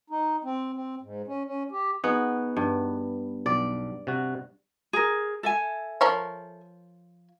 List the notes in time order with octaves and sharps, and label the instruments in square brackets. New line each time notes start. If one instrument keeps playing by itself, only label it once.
[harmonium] D#4
C4
C4
G#2
C#4
C#4
G4
[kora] B3 [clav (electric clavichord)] D#4 F#4 G#4
[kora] G2
[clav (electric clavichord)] B1 [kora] D5
[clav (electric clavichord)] C3 F#4
[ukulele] G#4 A#4
A4 E5 G#5
[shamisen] F3 A#4 C#5